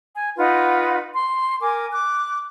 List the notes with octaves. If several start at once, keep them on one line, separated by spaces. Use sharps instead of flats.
G#5
D#4 F4 B4 F#5
C6
A#4 G#5 D6
D6 F#6